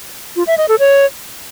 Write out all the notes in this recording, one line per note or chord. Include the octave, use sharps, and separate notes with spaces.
F4
E5
D#5
A4
C#5